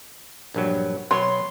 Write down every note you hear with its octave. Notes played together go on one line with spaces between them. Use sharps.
A#1 G2 F#3
B2 F#3 C#5 C6